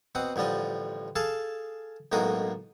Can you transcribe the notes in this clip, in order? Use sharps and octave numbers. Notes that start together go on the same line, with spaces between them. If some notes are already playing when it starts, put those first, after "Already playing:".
B2 C4 F#5 D#6
A1 D3 F3 G3 D#5
G#4 A4 F5 A5
B1 A2 G#3 A#3 F#4 D#6